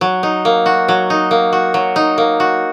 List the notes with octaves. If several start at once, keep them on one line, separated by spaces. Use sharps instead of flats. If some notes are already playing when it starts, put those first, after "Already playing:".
F#3
D#4
A#3
F#4
F#3
D#4
A#3
F#4
F#3
D#4
A#3
F#4